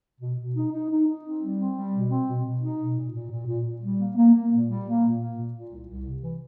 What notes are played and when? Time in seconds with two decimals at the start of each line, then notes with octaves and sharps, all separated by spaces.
0.21 B2
0.38 B2
0.56 D#4
0.72 D#4
0.91 D#4
1.07 D#4
1.24 C4
1.41 G3
1.59 C4
1.76 G3
1.93 B2
2.10 C4
2.27 B2
2.45 B2
2.62 D#4
2.79 B2
2.95 A#2
3.13 A#2
3.31 A#2
3.47 A#2
3.64 A#2
3.82 G3
3.99 A#3
4.16 A#3
4.33 A#3
4.51 A#2
4.68 G3
4.84 A#3
5.02 A#2
5.19 A#3
5.37 A#2
5.53 A#2
5.71 C2
5.88 C2
6.05 C3
6.22 E3